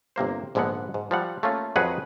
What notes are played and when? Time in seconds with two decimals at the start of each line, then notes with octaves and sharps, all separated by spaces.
0.16 G1 C3 A#3 C5
0.55 A#1 G#2 D3 G#3 B3 F#5
0.94 G#2
1.11 F3 G3 F#5
1.43 A3 A#3 C#4 F4
1.76 F2 F#3 D#4 G#4 B4 F#5